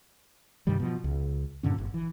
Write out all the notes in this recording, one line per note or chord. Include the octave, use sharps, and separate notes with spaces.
G2 C3 D#3 G3
B2 F3
C#2
G2 A#2 D3 C#4
G1
E3